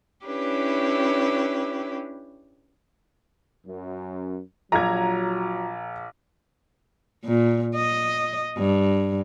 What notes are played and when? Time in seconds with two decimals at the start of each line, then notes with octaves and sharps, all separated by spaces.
0.24 C#4 D4 E4 G4 B4 C#5
3.67 F#2
4.72 A#1 F#3 F4 A#5 G#6
7.25 A#2
7.76 D#5
8.58 G2